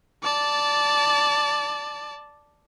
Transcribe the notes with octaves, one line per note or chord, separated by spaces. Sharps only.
D5 A5